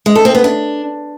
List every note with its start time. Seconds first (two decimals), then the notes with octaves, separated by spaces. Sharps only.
0.06 G#3
0.15 A4
0.25 C4
0.35 B3
0.44 D4